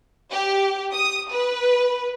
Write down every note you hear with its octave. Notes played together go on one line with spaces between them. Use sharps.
G4
D#6
B4